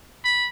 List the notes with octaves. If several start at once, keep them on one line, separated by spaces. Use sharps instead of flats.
B5